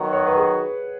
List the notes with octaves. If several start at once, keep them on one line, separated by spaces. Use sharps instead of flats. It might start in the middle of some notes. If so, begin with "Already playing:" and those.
Already playing: D#3 F#3 B3 F#4 F#5
C#5
B4
G#4